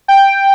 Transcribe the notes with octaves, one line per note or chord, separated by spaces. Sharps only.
G5